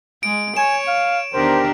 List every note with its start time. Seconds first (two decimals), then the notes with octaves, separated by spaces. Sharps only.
0.23 G#3 D7
0.57 C#5 G#5 E7
0.88 F5
1.33 E2 D#3 D4 G4 A#4 C5